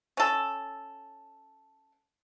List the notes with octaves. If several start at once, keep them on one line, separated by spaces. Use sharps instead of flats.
C#4 A4